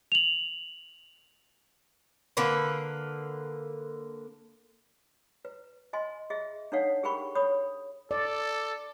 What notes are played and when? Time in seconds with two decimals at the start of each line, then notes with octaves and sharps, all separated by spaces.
0.12 F7 F#7
2.37 D3 A#3 B4
5.45 B4
5.93 D#5 G#5 C6
6.30 G#4 D#5 E5
6.72 D4 D#4 A4 C#5 F5 F#5
7.03 G4 G#4 A#4 G5 B5 C#6
7.35 A4 C#5 B5 D#6
8.11 A4 D5